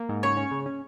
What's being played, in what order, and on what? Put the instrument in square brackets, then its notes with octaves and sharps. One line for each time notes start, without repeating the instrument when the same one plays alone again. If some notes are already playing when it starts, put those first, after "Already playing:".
Already playing: [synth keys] A#3
G#2
[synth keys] C#3 [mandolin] C#5
[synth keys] C#4
C#3
C#4